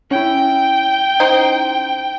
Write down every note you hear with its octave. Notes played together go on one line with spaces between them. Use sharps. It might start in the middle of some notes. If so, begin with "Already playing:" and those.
C#4 E4 G5
D#4 C5